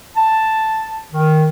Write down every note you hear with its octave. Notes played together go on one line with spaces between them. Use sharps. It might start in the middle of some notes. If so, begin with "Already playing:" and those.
A5
D#3